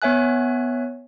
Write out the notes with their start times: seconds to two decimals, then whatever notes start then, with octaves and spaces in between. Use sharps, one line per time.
0.02 B3 C#5 E5 G#5 F#6